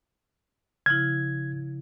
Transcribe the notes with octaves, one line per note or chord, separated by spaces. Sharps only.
C#3 F3 E4 G#6